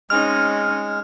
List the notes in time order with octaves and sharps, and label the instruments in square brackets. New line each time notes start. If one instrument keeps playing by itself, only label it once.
[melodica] G#3 [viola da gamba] C4 C#4 D#4 [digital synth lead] F6